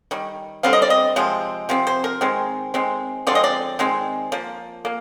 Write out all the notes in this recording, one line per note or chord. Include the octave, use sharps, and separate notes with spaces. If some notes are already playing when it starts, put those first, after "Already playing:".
D#3 G3
D3 G3 C4 F5
D#5
D5
D#5
C3 F3 G#3 C4
C3 F3 C4
C5
A#4
D#3 G#3 C4
D#3 G#3 C4
D3 F3 G#3 C4 D5
D#5
D5
D#3 G#3 C4
F3 A#3
A#3